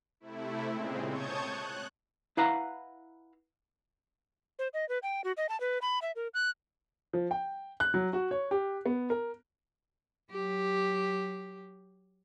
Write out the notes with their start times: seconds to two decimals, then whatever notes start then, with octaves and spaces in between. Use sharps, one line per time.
0.20 C3 A3 E4
0.70 A#2 C#3 G#3 C4
1.09 C#5 A5 C#6 D#6 G6 G#6
1.43 F#6
2.37 E4 B4 F5 F#5 A#5
4.59 C5
4.74 D#5
4.89 B4
5.03 G5
5.24 F#4
5.37 D#5
5.49 A5
5.60 B4
5.82 B5
6.02 E5
6.16 A#4
6.34 F#6
7.13 F3
7.31 G5
7.80 F#6
7.94 F#3
8.13 F#4
8.31 C#5
8.51 G4
8.86 B3
9.10 A#4
10.31 F#3 G4